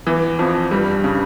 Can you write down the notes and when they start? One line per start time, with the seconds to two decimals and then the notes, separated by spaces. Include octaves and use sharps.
0.06 E2 E3
0.39 F2 F3
0.71 G2 G3
1.04 C#3